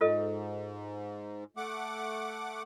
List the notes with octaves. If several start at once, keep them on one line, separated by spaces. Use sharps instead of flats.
G#2 F4 A4 D#5
A3 F#5 D6